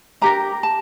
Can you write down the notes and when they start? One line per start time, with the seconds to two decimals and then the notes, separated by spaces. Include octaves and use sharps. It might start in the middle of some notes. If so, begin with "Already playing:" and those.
0.21 D4 G4 A#4 A#5
0.63 A5